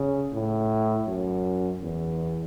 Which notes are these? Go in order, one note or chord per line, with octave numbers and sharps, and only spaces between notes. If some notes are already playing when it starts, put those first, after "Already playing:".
Already playing: C#3
A2
F#2
E2